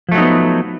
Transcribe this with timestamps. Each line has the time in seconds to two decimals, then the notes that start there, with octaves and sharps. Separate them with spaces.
0.09 F3
0.12 A3
0.15 F#3
0.18 D#4
0.21 B3